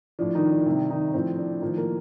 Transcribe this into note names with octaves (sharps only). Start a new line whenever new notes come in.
A2 F3 D4
D#3 D#4
D4
C3 D#3 G3
D#3 D#4
A2 F3 C4
D4
A2 D#3 F3 D#4
A#3 A#4